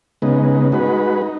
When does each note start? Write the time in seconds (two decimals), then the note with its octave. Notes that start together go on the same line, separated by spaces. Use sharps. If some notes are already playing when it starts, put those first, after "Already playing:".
0.22 C#3 G#3 B3 D#4
0.72 G#3 D#4 F#4 B4
1.22 D#4